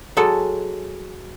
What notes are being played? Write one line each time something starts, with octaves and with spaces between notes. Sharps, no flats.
F#3 G#3 A4